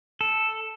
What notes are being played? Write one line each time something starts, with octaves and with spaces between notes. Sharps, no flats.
A4